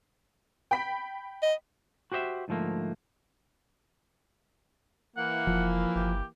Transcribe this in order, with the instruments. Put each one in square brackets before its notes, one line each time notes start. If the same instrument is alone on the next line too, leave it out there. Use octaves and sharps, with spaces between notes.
[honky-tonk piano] G5 B5 B6
[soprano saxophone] D#5
[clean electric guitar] F#4 G4 C5 D#5 E5
D2 G#2 F3 A3 A#3
[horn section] E3 A#3 [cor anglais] F#5
[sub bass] F1 [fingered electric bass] F3
[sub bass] G1 [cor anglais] G4